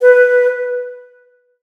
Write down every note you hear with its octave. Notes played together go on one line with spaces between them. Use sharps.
B4